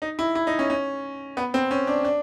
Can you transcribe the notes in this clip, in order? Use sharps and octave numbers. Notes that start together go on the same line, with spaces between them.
D#4
E4
E4
D#4
C#4
C#4
B3
C4
C#4
D4
D4